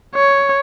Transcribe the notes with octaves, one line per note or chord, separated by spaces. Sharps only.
C#5